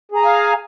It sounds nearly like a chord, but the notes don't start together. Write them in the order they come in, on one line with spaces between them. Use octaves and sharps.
G#4 A#5 G#5 F5